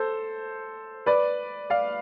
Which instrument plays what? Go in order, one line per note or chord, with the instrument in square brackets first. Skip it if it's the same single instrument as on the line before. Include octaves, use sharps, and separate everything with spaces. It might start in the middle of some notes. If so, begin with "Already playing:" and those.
Already playing: [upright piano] A4 C5
B4 D5
D5 F5